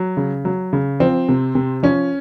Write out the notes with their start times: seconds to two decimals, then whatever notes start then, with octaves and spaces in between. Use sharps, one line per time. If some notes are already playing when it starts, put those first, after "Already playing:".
Already playing: F#3
0.17 C#3
0.45 F#3
0.73 C#3
1.00 F3 C4
1.29 C3
1.55 C3
1.83 F3 C#4